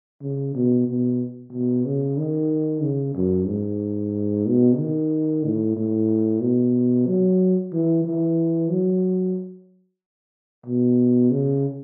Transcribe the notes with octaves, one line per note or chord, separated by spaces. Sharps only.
C#3
B2
B2
B2
C#3
D#3
C#3
F#2
G#2
B2
D#3
A2
A2
B2
F#3
E3
E3
F#3
B2
C#3